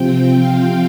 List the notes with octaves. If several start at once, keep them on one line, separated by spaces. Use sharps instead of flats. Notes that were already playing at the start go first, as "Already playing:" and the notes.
Already playing: C3 F3 C4 G5
F5